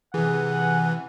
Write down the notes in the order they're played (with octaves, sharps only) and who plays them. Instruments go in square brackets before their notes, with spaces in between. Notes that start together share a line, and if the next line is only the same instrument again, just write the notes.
[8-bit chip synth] C3 E3 [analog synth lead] G#4 [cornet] F#5